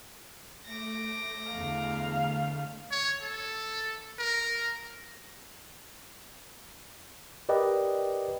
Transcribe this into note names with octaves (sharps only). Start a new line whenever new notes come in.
A3 D6 A#6
E2 D3 F5
C#5
A4
A#4
G4 A#4 B4 D5 D#5 G5